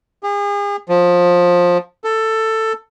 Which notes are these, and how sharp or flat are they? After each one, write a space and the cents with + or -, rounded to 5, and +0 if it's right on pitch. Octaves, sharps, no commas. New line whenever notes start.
G#4 -40
F3 +20
A4 +10